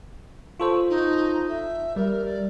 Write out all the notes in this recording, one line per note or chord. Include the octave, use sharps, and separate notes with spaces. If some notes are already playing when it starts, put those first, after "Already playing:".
F4 A4 C5 C#6
D#4
E5
G3 A#4
D5